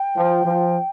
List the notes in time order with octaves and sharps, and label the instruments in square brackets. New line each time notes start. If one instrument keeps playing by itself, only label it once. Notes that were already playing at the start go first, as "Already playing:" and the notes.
Already playing: [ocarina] G5
[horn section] F3
F3